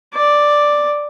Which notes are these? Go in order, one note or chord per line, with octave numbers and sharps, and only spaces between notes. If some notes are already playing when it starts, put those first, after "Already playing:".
D5